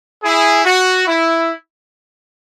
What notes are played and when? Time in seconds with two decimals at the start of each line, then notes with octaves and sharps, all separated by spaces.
0.23 E4 G#4
0.65 F#4
1.07 E4